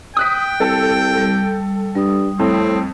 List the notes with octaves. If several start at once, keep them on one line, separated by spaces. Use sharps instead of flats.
G5 D#6 F#6 B6
C2 A4
G3
G2 G3 D#6
F2 A2 C4